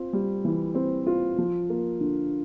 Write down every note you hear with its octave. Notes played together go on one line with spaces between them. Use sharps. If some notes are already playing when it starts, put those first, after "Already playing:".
Already playing: C4 F4
G3
E3
C4
F4
F3
A#3
D3